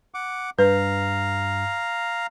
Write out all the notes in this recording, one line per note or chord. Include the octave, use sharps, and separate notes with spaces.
F#5 D6
G2 B4 F5 A#5